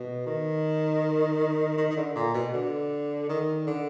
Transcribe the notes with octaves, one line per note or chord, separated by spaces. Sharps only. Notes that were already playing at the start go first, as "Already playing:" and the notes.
Already playing: B2
D#3
D#3
D#3
D3
A#2
B2
D3
D#3
D3